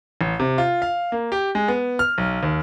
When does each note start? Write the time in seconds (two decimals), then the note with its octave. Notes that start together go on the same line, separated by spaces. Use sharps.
0.21 A1
0.40 C3
0.58 F4
0.82 F5
1.12 A#3
1.32 G4
1.55 G#3
1.68 B3
1.99 F6
2.18 B1
2.43 D#2